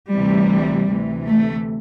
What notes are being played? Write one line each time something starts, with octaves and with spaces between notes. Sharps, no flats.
D2 C3 E3 G3
D2 C3 E3
A3